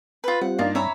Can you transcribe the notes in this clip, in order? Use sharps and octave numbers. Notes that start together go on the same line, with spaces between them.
F4 B4
G3 C4 F4 F#5
G2 A#3 D4 D#4 F4
C#4 E5 A#5 B5